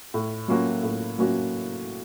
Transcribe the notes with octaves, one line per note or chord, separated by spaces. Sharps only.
A2
F#3 A#3 C#4 F#4
A2
F#3 A#3 C#4 F#4